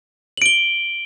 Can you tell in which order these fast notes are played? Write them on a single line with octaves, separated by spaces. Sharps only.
F#7 D7 G7